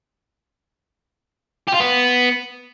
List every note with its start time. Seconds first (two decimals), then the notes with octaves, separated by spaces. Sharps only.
1.68 G4
1.74 F4
1.80 B3